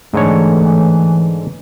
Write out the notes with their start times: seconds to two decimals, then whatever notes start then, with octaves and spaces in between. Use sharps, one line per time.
0.14 G#2 D3 E3 A3 C#5